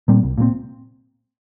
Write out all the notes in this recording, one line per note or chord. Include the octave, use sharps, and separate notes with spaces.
A#2 G3 C4
C2
A#2 G3 C4